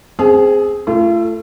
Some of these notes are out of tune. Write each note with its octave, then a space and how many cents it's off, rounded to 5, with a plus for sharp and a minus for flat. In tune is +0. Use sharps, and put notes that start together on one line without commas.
C4 -5 G#4 +0 G#5 +45
A3 +5 F4 -40